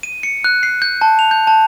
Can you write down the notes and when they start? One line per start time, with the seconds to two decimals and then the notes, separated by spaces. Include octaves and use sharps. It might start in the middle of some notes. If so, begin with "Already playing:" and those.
0.03 D#7
0.23 C#7
0.44 F#6
0.63 C7
0.82 G6
1.01 A5
1.19 F7
1.31 G6
1.47 A5